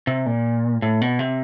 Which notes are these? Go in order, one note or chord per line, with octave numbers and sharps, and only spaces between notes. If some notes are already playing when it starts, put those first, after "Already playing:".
C3
A#2
A2
B2
C3